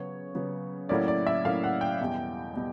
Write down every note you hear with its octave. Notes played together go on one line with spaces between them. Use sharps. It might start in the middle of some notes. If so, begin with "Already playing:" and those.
Already playing: C#3 F#3 B3 C#5
C#3 F#3 B3
A2 F#3 A#3 C#4 E4 D5
D5
E5
A2 F#3 A#3 C#4 E4 F5
F#5
G5
E2 B2 G3
B2 G3